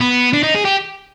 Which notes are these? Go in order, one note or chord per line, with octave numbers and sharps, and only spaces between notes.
B3
D4
D#4
G#4
G4